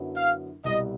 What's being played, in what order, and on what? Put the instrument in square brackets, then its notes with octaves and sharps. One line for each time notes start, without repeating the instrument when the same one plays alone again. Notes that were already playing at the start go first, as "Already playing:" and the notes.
Already playing: [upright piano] F#2 D3 F#3 B3 E4
[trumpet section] F5
[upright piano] C2 B2 G3 [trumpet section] D#5